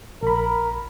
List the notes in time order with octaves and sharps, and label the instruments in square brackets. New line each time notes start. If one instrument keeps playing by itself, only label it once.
[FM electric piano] A#1 B5 [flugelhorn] A#4